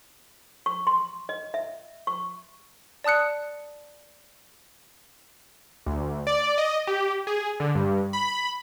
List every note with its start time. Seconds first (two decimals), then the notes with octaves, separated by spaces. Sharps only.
0.66 C#6
0.87 C6
1.29 D#5
1.54 E5
2.07 C#6
3.04 D5 A5 D#6 F#6 C#7
5.87 D2
6.27 D5
6.58 D#5
6.87 G4
7.27 G#4
7.60 D3
7.75 G2
8.13 B5